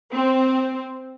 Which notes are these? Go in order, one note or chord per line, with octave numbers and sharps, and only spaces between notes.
C4